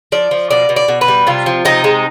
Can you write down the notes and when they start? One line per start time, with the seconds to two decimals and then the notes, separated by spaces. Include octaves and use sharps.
0.12 F3 D5
0.31 F3
0.51 B2 D5
0.69 B2
0.76 D5
0.88 B2
1.01 B4
1.08 G3
1.27 C3 F4
1.46 F3
1.65 C3 D#4
1.84 G#3